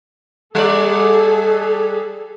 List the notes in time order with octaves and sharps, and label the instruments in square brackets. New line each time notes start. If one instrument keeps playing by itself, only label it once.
[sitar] G3 D5 [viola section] G#4 A4